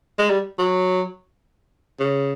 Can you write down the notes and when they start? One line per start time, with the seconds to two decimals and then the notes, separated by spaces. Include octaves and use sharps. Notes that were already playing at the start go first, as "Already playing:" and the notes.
0.19 G#3
0.30 G3
0.59 F#3
2.00 C#3